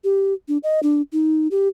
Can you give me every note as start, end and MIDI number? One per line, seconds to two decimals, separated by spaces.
0.04 0.34 67
0.48 0.58 62
0.63 0.80 75
0.83 1.01 62
1.13 1.48 63
1.51 1.68 67